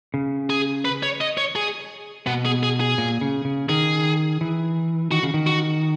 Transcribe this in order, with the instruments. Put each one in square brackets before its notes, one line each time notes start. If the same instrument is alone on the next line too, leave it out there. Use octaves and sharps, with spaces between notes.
[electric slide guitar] C#3
[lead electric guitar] G#4
B4
C#5
D#5
C#5
G#4
[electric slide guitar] B2 [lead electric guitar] B3
[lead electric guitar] G#4
G#4
G#4
[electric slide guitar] A#2
C#3
C#3
[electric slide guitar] D#3 [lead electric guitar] G#4
[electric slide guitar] E3
[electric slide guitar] D#3 [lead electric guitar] F#4
[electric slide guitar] C#3
D#3
[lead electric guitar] F#4